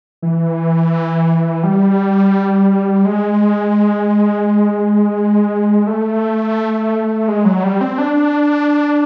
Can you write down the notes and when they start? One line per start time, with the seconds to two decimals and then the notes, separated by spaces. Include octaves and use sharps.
0.22 E3
1.63 G3
3.05 G#3
5.87 A3
7.28 G#3
7.45 F#3
7.64 G3
7.81 C4
7.98 D4